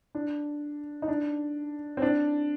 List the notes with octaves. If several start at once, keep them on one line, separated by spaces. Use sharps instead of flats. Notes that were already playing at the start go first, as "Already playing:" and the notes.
D4
D#4
D4
C4
D4